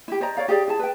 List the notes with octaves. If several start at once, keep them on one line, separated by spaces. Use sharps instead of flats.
E4 G4
C5 D5 D#5 A#5
C#5 D5 F5
G4 G#4 D5
E4 G#4 A5
B4 G5